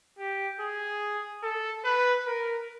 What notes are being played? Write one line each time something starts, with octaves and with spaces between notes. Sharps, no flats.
G4
G#4
A4
B4
A#4